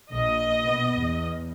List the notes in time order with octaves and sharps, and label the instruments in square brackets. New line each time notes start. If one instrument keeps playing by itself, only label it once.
[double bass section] A#1 A#2 [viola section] D#5
[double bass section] B2 B3
E2